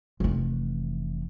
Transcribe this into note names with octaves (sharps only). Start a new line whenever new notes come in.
F1 E3